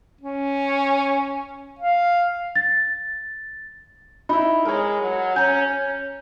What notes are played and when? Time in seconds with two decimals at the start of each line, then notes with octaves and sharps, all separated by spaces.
0.21 C#4
1.79 F5
2.56 A6
4.29 D#4 E4 B5
4.65 G#3 A#4 C#5
5.01 F#3
5.36 C#4 G#5 A#5 G6
5.71 C#4